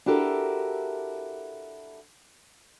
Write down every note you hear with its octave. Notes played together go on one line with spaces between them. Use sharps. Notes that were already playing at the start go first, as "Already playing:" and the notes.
D4 E4 F#4 G4 A4 A#4